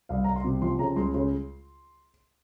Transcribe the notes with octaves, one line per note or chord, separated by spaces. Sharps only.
C2 F5
C2 A#5
C6
C3
F3 C6
C#3 A#5
C#2 C6
C#3 C6